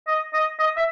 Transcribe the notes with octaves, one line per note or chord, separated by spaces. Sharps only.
D#5
D#5
D#5
E5